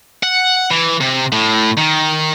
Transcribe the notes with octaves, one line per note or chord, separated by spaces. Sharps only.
F#5
E3
C3
A2
D#3